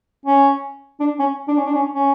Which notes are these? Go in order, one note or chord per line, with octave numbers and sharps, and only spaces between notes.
C#4
D4
C#4
D4
C#4
D4
C#4
C#4